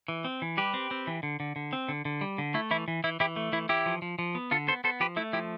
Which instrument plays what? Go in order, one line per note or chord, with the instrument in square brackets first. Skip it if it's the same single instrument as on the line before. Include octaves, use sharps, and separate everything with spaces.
[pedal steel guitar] E3
C4
E3
G3 G4 B4
C4
C4
E3
D3
D3
D3
C4
D3
D3
G3
D3
A3 E4
E3 E4
E3
E3 E4
E3 E4 G4
A3
E3 E4
E3 E4 G4
F3
F3
F3
B3
D3 F4 A4
B3 A4 C5
B3 A4 C5
F3 G4 B4
A3 E4
F3 E4 G4